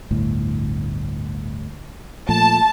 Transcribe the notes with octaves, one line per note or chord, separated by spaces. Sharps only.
G1 D2 A2
A#2 F3 A3 A5